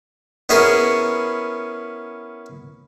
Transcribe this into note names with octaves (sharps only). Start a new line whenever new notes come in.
B3 C#4 E4 G#4 A#4